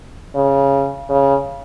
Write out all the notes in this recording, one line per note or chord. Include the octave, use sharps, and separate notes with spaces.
C#3
C#3